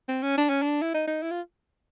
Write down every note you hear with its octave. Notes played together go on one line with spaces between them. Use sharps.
C4
C#4
D4
C#4
D4
E4
D#4
D#4
E4
F4